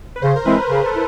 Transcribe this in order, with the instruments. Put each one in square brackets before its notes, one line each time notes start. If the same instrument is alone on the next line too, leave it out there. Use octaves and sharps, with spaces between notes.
[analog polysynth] B4
[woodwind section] C#3 [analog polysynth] C5
[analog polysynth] A#4
[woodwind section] E3 G#3 C4 E4 [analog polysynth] B4
[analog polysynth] B4
[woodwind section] C#3 [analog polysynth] A#4
[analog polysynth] A4
[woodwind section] E4